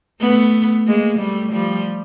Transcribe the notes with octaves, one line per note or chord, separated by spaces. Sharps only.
A3 B3
G#3 A#3
G3 A3
F3 G3